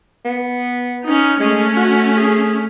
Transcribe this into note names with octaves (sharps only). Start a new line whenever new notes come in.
B3
C#4 D#4
G#3 A3 C#4
F#4
G#4